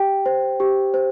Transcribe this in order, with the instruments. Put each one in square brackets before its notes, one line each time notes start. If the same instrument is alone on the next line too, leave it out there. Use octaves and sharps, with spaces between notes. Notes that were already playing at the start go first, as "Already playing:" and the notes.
Already playing: [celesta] G4 G5
C5
G4
C5